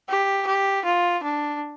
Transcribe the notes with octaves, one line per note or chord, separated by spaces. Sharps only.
G4
G4
F4
D4